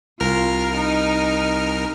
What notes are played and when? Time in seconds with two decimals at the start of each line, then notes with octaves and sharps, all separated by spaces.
0.20 C2 F4 A#4 F6
0.75 D#4